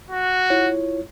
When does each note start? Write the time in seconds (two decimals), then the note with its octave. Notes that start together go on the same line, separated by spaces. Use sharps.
0.10 F#4
0.50 E4 F4 C#5